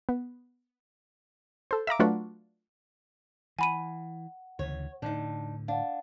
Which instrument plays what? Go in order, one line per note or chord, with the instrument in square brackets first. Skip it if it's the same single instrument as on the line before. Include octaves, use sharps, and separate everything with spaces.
[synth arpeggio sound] B3
A4 C5
E5 F5 A#5 D6
F#3 A3 D4 F4 F#4 B4
[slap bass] E3 [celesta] F#5 [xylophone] G#5 B5 D#7
[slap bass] D2 C#3 E3 [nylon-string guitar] C#5
[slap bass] A2 D3 [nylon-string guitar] D4 D#4
[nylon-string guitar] D4 [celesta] F5 F#5